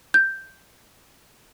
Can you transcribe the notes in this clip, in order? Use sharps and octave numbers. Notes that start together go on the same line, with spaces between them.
G6